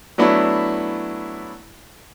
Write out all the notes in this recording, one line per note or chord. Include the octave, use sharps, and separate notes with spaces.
F#3 A3 B3 D4 E4